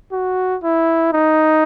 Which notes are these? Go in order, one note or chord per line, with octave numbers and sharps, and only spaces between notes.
F#4
E4
D#4